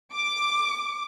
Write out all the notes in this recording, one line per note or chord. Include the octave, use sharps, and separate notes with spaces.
D6